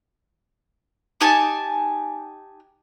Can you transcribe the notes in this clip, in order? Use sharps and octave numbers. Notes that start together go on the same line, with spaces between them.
D#4 G4 G#5 A5